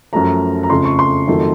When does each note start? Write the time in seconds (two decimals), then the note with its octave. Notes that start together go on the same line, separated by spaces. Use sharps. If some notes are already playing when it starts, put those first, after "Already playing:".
0.13 F#2 F3 A3 A#5
0.63 A#5
0.70 F2 C#3 A3 C6
0.85 C#6
0.99 C6
1.27 F2 D#3 F#3 A3